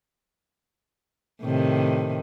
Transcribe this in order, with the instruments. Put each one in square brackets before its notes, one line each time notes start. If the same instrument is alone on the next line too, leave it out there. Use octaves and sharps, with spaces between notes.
[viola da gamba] A2 C3 D#3